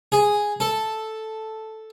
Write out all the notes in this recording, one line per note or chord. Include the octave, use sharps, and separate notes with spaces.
G#4
A4